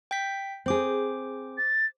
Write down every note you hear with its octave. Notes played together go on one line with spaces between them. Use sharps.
G5 G6 B6
C4 G#4 C5 D6
A6